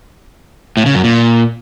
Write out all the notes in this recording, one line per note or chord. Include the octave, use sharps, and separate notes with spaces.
A2
C#3
F#2
A#2